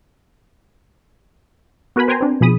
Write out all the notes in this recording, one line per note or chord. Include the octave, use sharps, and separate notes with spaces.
B3 F#4 A#4 B4 G#5 B5
B4 C5 G5 G#5 A#5 C6
C4 D4
B2 F3 G#4 B5 D#6